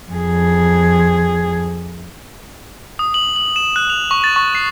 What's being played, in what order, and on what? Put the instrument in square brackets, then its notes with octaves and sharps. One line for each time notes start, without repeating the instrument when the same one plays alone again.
[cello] F2 G#4
[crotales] D#6
F#7
F#7
E7
F#6
F7
C#6
A6
C#6
C7